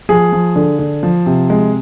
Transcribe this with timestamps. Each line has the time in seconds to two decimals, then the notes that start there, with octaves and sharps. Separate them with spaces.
0.09 F3 G#4
0.32 F3
0.56 D3
0.79 D3
1.03 F3
1.26 C3
1.50 G#3